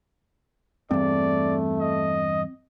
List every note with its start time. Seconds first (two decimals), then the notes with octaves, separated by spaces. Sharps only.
0.91 E2 G2 A3 C4 D5
1.80 D#5